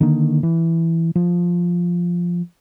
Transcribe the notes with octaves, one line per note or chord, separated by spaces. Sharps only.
D3 D#3 A#3
E3
F3